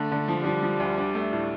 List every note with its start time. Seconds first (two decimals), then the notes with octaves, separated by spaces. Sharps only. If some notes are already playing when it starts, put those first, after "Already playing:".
Already playing: D3 A3
0.12 D3
0.28 F3
0.45 F3 G3
0.63 F3
0.80 D2
0.98 D4
1.15 A3
1.33 A2